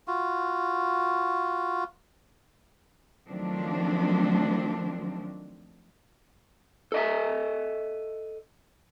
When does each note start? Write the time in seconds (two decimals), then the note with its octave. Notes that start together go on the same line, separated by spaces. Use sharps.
0.07 F4 F#4
3.29 D#3 F3 F#3 A3 C4 D4
6.92 A4 D#5 E5